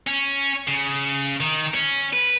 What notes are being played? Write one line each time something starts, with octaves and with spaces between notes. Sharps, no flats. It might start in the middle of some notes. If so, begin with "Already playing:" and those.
C#4
C#3
D#3
C#4
B4